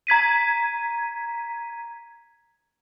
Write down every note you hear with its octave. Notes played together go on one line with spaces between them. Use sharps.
A#5 G#6 B6 D#7